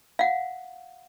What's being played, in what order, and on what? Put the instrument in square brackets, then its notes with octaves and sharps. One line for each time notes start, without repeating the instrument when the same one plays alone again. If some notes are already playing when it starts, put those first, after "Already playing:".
[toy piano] F5 F#5